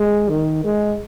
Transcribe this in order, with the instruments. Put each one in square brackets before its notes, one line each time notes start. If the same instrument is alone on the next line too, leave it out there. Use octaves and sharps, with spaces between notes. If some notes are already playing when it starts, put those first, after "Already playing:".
Already playing: [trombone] G#3
D#3
G#3